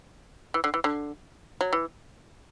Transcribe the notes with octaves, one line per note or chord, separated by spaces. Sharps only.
E3
D3
E3
D3
F#3
E3